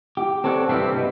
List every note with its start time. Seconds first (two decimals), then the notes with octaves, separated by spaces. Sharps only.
0.17 G4
0.44 C4 A4 C#5 D5 F#5
0.69 G2 C3 E3 G3 C4
0.96 B2